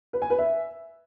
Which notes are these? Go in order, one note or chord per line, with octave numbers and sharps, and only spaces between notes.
B4
G#5
B4
E5